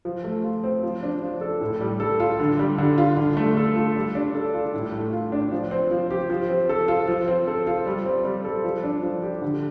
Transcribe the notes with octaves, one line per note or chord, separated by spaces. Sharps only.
F3
A3
F4
C4
F3
D4
F3
A4
A2
G3
A4
F4
D3
G3
D3
F4
D3
A3
A4
F4
G3
D4
A4
F4
A2
A3
F4
D4
F3
C4
F3
G4
F3
C4
A4
F4
F3
C4
A4
F4
G3
C4
G3
A4
F3
D4
F3
G4
D3